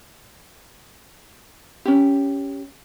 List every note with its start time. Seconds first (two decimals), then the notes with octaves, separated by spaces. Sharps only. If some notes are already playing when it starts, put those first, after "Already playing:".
1.86 C#4 G4